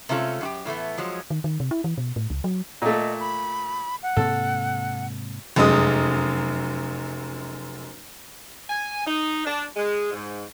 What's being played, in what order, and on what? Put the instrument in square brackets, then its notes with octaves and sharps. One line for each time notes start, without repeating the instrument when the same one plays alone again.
[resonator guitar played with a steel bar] C3 G#3 A3 C#4 F4 A4
F#2 F#4 G4
A2 E3 A3 B3
F3 F#3 G#3
[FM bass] D#3
D#3
C3
E4
E3
B2
A2
C#2
F#3
[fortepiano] A#2 A3 [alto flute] D#5
[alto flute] B5
F#5
[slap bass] G#2 C3 A#3 [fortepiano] A4
[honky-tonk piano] F1 F#2 G#3 D#6
[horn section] G#5
D#4
D4
G#3
G#2